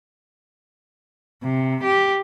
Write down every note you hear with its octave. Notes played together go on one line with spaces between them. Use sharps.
C3
G4